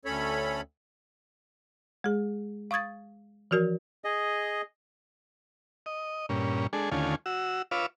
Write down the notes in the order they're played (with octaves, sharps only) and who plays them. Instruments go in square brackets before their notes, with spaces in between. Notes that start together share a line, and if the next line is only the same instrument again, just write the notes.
[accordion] D2 C#4 A4 C#5 B5
[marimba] G#3 G#4
F5 C#6 D#6 G#6 A6
E3 F3 F#4 A#4
[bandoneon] G#4 D#5
[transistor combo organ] D#5
G2 A#2 C#4
G#3 D4 G#4 A4
D#2 D3 A3 C#4 F4 G#5
F#4 E6
F4 B4 C#5 F5 D6 E6